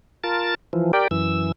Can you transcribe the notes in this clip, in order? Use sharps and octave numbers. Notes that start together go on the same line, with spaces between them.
F4 A#4 A5 A6
E3 F3
G4 A#4 D5 G5
F#2 E3 E6